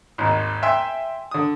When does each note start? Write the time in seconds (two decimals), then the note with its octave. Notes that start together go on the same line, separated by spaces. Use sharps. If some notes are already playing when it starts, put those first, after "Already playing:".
0.18 G#1 D#2 G#2
0.63 E5 G5 G#5 C6 E6
1.31 D3 D#6